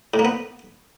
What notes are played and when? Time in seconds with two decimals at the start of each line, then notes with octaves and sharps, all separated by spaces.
0.14 A2
0.19 A#3
0.25 B3